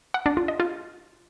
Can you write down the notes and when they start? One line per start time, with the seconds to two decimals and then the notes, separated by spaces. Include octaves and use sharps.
0.14 F#5
0.26 D4
0.37 F4
0.48 D#5
0.60 F4